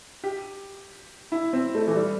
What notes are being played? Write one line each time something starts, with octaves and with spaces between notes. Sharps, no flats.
G4
E4
C4
A3
E3
G3